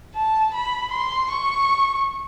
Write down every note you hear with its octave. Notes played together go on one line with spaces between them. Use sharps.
A5
B5
C6
C#6